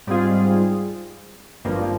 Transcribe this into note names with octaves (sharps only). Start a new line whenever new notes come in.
G#2 G3 C4 F4 G#4
G#1 G2 F3 A#3